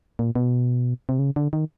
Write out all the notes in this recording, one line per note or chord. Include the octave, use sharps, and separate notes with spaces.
A#2
B2
C3
C#3
D3
D#3